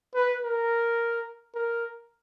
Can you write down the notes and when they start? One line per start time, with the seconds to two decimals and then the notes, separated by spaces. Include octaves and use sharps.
0.15 B4
0.43 A#4
1.55 A#4